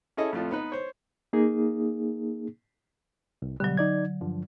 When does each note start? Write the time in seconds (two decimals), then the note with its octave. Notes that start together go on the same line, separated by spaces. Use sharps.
0.17 C#4 E4 G#4 A4 D#5
0.33 F2 A2 F4 A4
0.51 B3 D#4 B4
0.72 C5 C#5
1.33 A#3 D#4 G#4
3.42 C2
3.60 B2 D3 F#3 G3
3.77 D#4 D5 G#6
4.21 G2 D3 F3